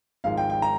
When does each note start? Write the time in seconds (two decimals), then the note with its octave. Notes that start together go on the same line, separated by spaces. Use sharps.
0.24 G#1 G#2 F3 G#3 F5
0.38 G5
0.50 G5
0.62 A#5